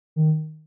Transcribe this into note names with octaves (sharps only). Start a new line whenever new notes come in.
D#3